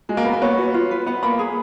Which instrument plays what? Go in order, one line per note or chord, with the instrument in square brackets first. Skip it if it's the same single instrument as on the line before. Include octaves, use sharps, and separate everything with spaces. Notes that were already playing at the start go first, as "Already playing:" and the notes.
[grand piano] G#3 [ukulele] F#4
[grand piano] A#3
[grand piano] B3 [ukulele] A#4
[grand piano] A#3
[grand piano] B3 [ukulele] C#5
[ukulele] F#4
F4
B4
[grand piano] B3 [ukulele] F#5
[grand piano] A#3 [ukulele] B5
[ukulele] G#4